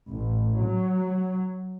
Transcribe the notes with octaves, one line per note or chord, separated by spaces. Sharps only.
A1
F#3